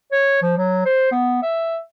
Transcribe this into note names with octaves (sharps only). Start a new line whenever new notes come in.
C#5
F3
F#3
C5
B3
E5